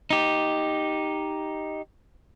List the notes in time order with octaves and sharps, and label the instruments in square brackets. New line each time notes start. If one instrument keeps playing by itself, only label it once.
[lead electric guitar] D#4 G4